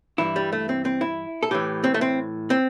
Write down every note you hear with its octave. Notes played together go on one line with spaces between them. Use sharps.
G2 E3 E4
G3
A3
C4
C4
E4
A4
A2 E3 G4
C4
A3
C4
C4